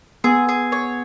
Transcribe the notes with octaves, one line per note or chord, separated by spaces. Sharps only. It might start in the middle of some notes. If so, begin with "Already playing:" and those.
B3 G#4
G#4
C#5